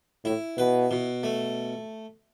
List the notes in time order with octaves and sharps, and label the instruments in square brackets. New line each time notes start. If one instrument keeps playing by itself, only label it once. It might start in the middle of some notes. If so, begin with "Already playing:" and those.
[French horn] A2 [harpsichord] E4
[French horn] B2 [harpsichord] B4
[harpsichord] B2
A3